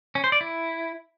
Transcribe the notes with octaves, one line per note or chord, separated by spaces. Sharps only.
C#4
C5
D5
E4